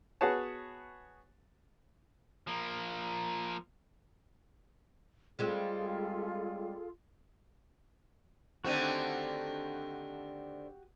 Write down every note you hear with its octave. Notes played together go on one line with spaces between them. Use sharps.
B3 F#4 G#4 B4 C#5 A5
F3 A#3
G3 G#3 C4 F4 G#4 A4
D3 D#3 A3 C4 F#4 G4 G#5